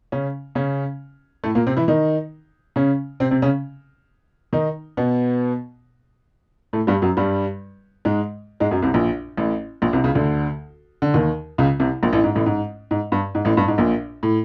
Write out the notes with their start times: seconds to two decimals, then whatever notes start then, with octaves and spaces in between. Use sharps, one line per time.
0.12 C#3 C#4
0.55 C#3 C#4
1.44 A2 A3
1.55 A#2 A#3
1.67 C3 C4
1.77 E3 E4
1.88 D#3 D#4
2.76 C#3 C#4
3.20 C3 C4
3.31 C3 C4
3.42 C#3 C#4
4.53 D#3 D#4
4.97 B2 B3
6.73 A2 A3
6.87 G2 G3
7.02 F#2 F#3
7.17 G2 G3
8.05 G#2 G#3
8.60 G#2 G#3
8.71 F#2 F#3
8.82 C2 C3
8.94 A#1 A#2
9.37 A1 A2
9.82 A#1 A#2
9.93 C2 C3
10.04 C#2 C#3
10.15 D2 D3
11.02 D3
11.14 D#2 D#3
11.58 C#2 C#3
11.80 C2 C3
12.03 A#1 A#2
12.13 A1 A2
12.24 G#2
12.35 A1 A2
12.46 G#2
12.91 G#2
13.12 G2
13.35 G#2
13.45 A1 A2
13.57 G2
13.68 G#2
13.78 A#1 A#2
14.23 A2